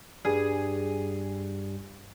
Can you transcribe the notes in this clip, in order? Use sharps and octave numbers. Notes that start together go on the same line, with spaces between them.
G2 G3 G#4